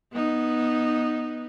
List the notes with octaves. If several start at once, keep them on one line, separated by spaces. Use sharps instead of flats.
B3 D#4